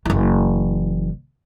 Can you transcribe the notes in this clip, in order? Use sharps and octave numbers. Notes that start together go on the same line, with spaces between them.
F#1 E3